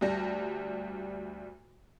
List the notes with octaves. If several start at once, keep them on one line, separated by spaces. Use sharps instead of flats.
D2 G3 A#6